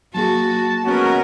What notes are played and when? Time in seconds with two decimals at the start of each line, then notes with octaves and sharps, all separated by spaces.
0.15 F#3 A#3 F#4 G#4 A5
0.85 G#3 B3 C#4 F#4 A#4